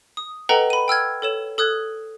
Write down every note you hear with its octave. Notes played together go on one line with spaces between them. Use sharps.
D#6
A4 B4 D#5 F#5 G5 A#5
B5 D#7
G5 E6 F6 G#6
A4 C#5 E7
A4 D#6 F#6 G#6